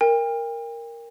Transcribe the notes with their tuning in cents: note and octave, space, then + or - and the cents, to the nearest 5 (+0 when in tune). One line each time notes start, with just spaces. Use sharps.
A#4 +0 G5 +40